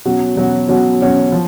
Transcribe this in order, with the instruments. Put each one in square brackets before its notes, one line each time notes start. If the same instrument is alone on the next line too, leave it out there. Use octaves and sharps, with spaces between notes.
[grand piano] B2 F#3 C#4 F#4
B2 F#3 C#4 F#4
B2 F#3 C#4 F#4
B2 F#3 C#4 F#4
F3